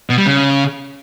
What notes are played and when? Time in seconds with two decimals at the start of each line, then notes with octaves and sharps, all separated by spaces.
0.10 B2
0.18 G3
0.27 C#3